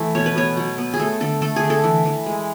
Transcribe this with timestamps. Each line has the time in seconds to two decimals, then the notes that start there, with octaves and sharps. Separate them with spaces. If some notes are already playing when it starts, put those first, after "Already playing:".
Already playing: E3 A3 A4
0.15 B2 C#5
0.26 B4
0.36 B2 C#5
0.57 F#3
0.78 B3
0.94 G#4
0.99 A3 A4
1.20 D3 A4
1.42 A3 A4
1.56 G#4
1.63 D3
1.70 A4
1.84 E3
2.05 E3
2.26 G#3